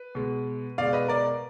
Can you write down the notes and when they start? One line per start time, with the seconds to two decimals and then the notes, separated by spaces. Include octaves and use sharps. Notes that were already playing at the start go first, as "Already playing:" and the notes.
Already playing: B4
0.15 B2 G#3
0.78 B2 G#3 D5 F5
0.93 B4 D#5
1.08 A#4 D5